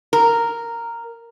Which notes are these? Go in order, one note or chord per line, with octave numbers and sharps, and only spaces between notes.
A#4